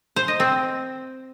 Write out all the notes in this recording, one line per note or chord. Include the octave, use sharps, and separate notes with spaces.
C5
D#5
C4